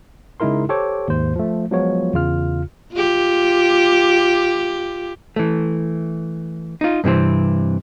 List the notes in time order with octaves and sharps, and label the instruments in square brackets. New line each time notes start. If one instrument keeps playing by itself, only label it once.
[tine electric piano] C#3 G#3 D#4 E4 A#4 C6
G4 A4 C5 C#5 D6
D#2 G#2 C5
F3 A3
F3 F#3 G#3 B3 F4 C#5
E2 C#3 F4 F6
[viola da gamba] F4 G4
[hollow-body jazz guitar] E3 A3
D#4 F4
G2 C3 E3 C4